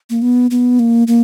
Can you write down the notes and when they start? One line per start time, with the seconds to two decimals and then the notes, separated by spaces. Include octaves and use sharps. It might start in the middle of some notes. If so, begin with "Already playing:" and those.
0.10 A#3
0.22 B3
0.51 B3
0.79 A#3
1.07 A#3